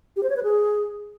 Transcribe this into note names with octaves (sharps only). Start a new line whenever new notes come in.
G4
C5
C#5
B4
G#4